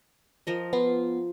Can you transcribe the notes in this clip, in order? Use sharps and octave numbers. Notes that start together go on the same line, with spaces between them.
F3 A#4 D#5
B3 F4